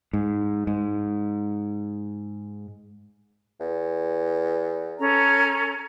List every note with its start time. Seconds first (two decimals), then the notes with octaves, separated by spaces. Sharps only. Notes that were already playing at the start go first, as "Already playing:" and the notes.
0.13 G#2
0.67 G#2
3.60 E2
4.98 C#4 A4 A#5